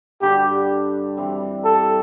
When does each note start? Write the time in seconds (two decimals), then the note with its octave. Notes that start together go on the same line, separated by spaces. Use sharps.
0.21 G2 D3 G3 D4 G4
1.17 E3 G3 C4
1.65 A4